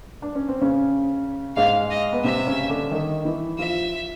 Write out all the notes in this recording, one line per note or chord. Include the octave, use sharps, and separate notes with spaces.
D4
C#4
C4
C#3 C#4
G#2 G#3 F5
D#5
B3
C3 C4 E5
C#3 C#4
D3 D4
D#3 D#4
E3 E4
F3 F4 E5